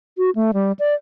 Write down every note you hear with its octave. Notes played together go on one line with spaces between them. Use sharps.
F#4
A3
G3
D5